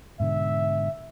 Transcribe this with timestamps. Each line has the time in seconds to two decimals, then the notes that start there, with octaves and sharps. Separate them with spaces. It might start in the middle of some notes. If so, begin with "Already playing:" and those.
0.20 G#2 B2 D3 E5